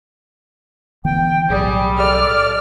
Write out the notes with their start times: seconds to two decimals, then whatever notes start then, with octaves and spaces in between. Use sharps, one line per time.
1.05 D3 E3 B3 G5
1.50 B1 A2 F#3 G3 G#4
2.00 A4 D5 F6